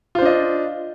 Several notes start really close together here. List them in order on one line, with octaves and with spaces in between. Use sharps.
F4 C5 D4 D#5